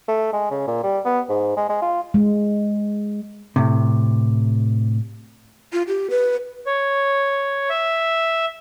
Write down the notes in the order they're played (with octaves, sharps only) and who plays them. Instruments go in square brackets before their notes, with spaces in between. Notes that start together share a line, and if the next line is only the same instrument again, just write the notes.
[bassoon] A3
G#3
C#3
A#2
G3
B3
G#2
G#3
G#3
F4
[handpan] G#3
[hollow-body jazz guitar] A2 C3
[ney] F4
G4
B4
[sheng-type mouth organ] C#5
E5